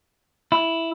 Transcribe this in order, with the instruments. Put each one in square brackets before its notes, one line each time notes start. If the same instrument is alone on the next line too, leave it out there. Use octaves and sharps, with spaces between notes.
[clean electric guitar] E4